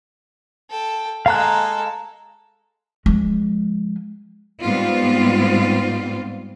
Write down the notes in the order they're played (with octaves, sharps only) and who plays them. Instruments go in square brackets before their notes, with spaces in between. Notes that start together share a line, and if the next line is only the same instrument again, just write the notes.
[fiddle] A4 G5
[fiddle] G#3 A4 [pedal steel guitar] F5 A#5 F#6
[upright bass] F3 G#3
[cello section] G#2 G3 B3 C4 F4